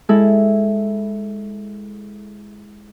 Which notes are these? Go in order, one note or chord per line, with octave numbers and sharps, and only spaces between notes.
G#3 E4 A4